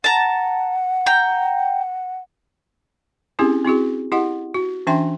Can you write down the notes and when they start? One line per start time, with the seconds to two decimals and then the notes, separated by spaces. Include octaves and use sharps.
0.04 F#5 A5 A#5
1.06 G5 A#5
3.39 C4 C#4 E4 G4 G#4
3.64 C4 E4 F#4 G#4
4.12 E4 G4 D#5 F#5
4.54 F#4
4.87 E3 C#4 D4 E5 G5 C6